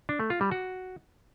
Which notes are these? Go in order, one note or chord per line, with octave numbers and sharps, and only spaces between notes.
D4
A3
F4
G3
F#4